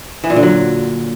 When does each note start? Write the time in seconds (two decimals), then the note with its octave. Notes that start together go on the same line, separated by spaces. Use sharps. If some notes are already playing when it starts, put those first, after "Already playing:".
0.24 E3
0.30 A#2
0.36 D3
0.43 F#3